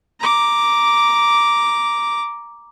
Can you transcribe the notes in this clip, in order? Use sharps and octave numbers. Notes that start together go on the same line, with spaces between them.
A#5 D6